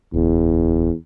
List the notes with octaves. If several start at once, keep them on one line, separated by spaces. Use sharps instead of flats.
D1 E2